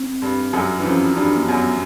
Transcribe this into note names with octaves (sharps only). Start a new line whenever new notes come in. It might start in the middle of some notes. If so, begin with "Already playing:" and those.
Already playing: C4
G2 G3
F#2 F#3
E3 D4
F2 F3 C#4
G2 G3 D4
A#3
F#2 F#3 B3